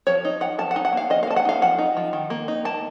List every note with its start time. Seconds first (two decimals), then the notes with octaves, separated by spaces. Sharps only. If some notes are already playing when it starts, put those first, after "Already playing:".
0.07 F3 C#5
0.25 D#4
0.41 F3 F#5
0.59 F3 A5
0.71 F#5
0.76 D#4
0.85 F#5
0.93 A#3 F5
1.10 F3 D#5
1.23 F5
1.27 A#3 A5
1.36 F#5
1.45 D#4 F5
1.62 F3 F#5
1.78 D#4
1.97 F3
2.13 D#3
2.30 A#3
2.48 D#4
2.65 A#3 A5